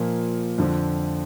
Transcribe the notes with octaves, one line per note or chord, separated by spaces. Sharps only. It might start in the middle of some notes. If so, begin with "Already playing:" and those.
Already playing: A#2 F3 A#3
F2 D3 F3